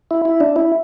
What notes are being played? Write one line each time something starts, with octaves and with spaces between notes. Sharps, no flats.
E4
E4
D4
E4